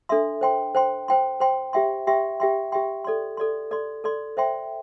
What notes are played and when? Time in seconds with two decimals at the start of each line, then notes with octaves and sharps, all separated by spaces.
0.09 D4 A4 E5 C6
0.41 C5 G5 C6
0.75 C5 G5 C6
1.08 C5 G5 C6
1.40 C5 G5 C6
1.73 G4 E5 G5 C6
2.07 G4 E5 G5 C6
2.40 G4 E5 G5 C6
2.72 G4 E5 G5 C6
3.05 A4 D5 C6
3.37 A4 D5 C6
3.71 A4 D5 C6
4.04 A4 D5 C6
4.37 C5 E5 G5 C6